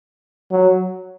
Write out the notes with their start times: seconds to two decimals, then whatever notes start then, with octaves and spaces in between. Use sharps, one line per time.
0.52 F#3